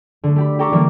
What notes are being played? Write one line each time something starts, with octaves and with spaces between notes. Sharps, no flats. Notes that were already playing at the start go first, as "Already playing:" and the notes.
D3 A3
A3 G4 B5
G4 A4 G5 A#5 C#6 D6
D3 E3 G3 A#3